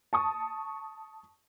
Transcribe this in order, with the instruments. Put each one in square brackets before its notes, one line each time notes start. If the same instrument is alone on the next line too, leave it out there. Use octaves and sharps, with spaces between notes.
[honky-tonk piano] A5 C#6 D#6